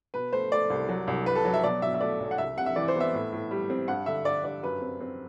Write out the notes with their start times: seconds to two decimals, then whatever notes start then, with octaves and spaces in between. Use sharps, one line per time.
0.14 B2 B4
0.33 A3 C5
0.52 A3 D5
0.70 C2
0.89 F#3
1.08 C2
1.26 C2 B4
1.36 A4
1.45 F#3
1.54 E5
1.64 B2 D5
1.82 B2 E5
1.94 E5
2.01 A3 D5
2.20 B1
2.31 F#5
2.38 C2 E5
2.57 C3 F#5
2.66 E5
2.76 E3 D5
2.88 C5
2.95 B3
3.00 E5
3.14 A2
3.32 A2
3.51 G3
3.70 C4
3.88 G2 F#5
4.06 D3 E5
4.25 G2 D5
4.44 G2 D5
4.63 F#2 B4
4.81 C4
5.01 C4